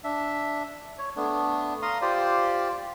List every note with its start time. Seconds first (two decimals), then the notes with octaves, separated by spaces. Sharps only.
0.04 D4 E5
0.98 C#5
1.16 A3 B3 D4
1.82 F5 A#5 C6 D#6
2.02 F4 G4 C5 D5